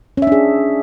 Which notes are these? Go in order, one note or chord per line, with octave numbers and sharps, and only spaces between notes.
C#4 D4 G#4 E5